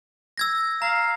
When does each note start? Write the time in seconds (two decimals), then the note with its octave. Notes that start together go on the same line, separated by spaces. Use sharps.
0.38 E6 G#6 A#6
0.82 F5 A#5